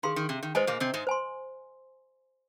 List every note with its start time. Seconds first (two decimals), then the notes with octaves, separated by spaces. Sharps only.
0.03 D#3 G#4 F5 C6
0.16 D#3
0.29 C3
0.43 D#3
0.55 G#2 G#3 C5 D#5 G#5
0.67 A#2 A#3
0.80 C3 C4
0.94 G#2 G#3
1.07 C5 G#5 C6